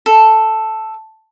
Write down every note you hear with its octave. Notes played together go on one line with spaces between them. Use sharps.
A4